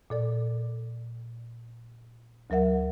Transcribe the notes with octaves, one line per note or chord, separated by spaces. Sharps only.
A#2 A4 D5
D2 F#3 A#4 E5 F#5